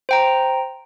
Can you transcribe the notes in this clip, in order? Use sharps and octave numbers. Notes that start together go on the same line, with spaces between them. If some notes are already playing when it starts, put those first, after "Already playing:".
C5 G5 A#5